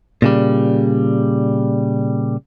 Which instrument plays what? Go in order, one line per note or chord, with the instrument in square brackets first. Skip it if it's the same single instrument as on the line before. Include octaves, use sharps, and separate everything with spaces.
[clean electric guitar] A#2 C#3 G3